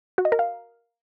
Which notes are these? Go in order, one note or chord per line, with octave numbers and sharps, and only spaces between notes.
F#4
D#5
A#4
F5